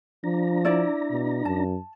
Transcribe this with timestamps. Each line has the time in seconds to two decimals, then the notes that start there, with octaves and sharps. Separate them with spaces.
0.24 F3 D4 A#5
0.65 E4 D5
1.11 B2
1.45 F#2 A5